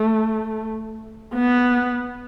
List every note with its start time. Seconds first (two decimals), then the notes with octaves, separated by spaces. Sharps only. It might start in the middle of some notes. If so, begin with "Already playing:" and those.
Already playing: A3
1.34 B3